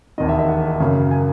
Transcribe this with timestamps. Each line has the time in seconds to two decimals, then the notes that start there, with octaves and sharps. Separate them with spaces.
0.18 E1 D#2 D#3 D#5
0.29 E5
0.39 E5
0.49 F#5
0.80 F#2 C#3 F#3 A#3
1.11 G#5